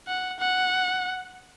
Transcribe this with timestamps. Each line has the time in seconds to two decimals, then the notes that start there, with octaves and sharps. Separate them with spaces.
0.08 F#5
0.40 F#5